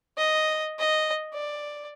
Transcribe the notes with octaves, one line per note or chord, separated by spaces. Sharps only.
D#5
D#5
D5